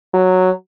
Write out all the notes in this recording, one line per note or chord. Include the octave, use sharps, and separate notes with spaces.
F#3